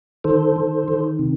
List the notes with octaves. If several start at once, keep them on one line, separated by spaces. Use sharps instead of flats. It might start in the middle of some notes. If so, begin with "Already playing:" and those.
D#3 A4 C5
D#3
D#3
C3